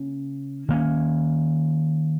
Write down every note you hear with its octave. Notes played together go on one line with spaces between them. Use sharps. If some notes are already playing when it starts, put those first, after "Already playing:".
Already playing: C#3 A#3
D#3 A#3 C#4